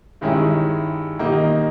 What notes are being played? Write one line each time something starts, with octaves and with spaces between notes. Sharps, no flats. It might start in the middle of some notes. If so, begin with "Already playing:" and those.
G2 D#3 G#3 C#4 E4
D#3 G3 A#3 D#4